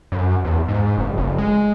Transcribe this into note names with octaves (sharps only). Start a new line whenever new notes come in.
F#2
E2
G#2
F#1
F#1
G#3